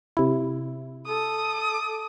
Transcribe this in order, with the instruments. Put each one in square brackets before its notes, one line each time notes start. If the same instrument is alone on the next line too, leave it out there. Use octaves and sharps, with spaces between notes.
[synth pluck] C3 E4
[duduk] A4 [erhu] D#6